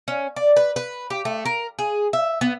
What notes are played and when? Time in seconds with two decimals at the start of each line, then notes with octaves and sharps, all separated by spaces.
0.08 C#4
0.36 D5
0.56 B4
0.76 B4
1.10 G4
1.25 A3
1.45 A#4
1.79 G#4
2.13 E5
2.41 B3